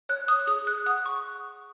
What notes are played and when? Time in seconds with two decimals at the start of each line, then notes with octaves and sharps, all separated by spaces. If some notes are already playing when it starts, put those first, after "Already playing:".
0.09 C#5 F#6
0.28 D#6
0.47 G#4 D#6
0.67 F#6
0.86 F#5 D#6
1.06 C#6